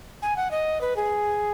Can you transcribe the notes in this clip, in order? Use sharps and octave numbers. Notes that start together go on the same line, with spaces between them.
G#5
F#5
D#5
B4
G#4